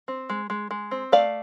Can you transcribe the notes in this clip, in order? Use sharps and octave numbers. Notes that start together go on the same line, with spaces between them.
C4
G#3
G#3
G#3
C4
A3 D5 F5